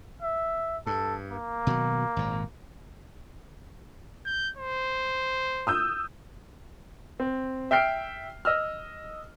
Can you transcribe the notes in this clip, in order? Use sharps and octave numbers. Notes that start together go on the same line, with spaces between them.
E5
G2 A4
A#3
B2 D#3 F#3
G#1 A#2
G6
C5
D#6 E6 G6
C4
E5 G5 F6 C7 D7
D#5 E6 F6